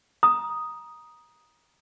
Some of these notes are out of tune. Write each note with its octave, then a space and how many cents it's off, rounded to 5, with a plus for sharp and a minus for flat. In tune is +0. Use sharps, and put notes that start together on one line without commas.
A#5 +20 D#6 +0